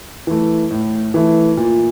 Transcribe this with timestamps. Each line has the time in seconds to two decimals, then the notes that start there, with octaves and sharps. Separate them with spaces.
0.27 E3 A3
0.71 A2
1.14 E3 A3
1.57 A#2